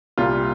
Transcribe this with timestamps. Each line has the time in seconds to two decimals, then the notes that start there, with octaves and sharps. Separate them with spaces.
0.18 C2 A#2 G3 F4